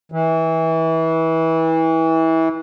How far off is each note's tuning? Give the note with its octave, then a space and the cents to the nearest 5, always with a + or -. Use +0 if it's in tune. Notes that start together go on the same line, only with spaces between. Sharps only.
E3 -25